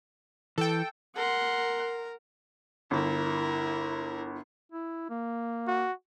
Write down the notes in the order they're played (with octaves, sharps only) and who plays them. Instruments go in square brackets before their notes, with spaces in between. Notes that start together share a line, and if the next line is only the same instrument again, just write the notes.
[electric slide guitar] E3 [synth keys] A4 G5
[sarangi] A#4 [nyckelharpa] F#5 C6
[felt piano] G1 [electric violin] E4 A#4
[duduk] E4
A#3
[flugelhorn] F#4